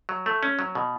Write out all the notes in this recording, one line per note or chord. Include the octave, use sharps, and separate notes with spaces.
F#3
A3
C#4
F#3
B2